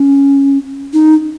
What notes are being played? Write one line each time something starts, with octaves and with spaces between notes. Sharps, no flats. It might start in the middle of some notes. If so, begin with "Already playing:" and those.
Already playing: C#4
D#4